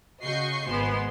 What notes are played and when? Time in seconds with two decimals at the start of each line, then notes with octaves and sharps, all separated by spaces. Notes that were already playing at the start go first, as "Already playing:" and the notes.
0.22 C#3 F#4 D#5 C#6 G6 C7
0.68 G#1 G#3 B3 C5 C6